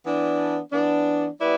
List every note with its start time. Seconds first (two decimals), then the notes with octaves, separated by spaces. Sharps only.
0.04 E3 B3 D4
0.73 E3 B3 D4
1.41 G3 B3 E4 B4 D5